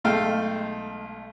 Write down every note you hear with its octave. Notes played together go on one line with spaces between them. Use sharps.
B1 G#3 A3 F5 G5